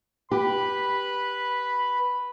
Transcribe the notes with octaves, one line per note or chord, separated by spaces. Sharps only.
G4 B4 B5